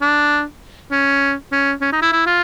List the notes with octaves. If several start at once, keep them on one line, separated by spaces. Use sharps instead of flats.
D4
C#4
C#4
C#4
D#4
E4
E4
F4